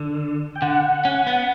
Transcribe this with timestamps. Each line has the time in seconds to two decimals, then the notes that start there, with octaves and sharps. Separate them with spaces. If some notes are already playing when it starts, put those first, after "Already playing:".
Already playing: D3
0.55 G5
0.62 D3 F#5
1.05 C#4
1.27 B3